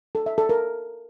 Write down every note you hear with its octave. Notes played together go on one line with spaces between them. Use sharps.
A4
E5
A4
A#4